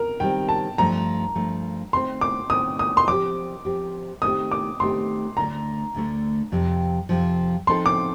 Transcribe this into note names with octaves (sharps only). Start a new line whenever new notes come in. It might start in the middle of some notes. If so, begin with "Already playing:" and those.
Already playing: A#4
D#3 G3 C4 G5
A5
G2 F3 A3 A#5
G2 F3 A3
D#3 A3 C4 C6
D6
D#3 A3 C4 D#6
D#6
C6
F3 C4 G4 D6
F3 C4 G4
D#3 A3 C4 G4 D#6
D6
D#3 A3 C4 G4 C6
D2 D3 A3 A#5
D2 D3 A3
F2 C3 F3
F2 C3 F3
F3 C4 D#4 A4 C6
D6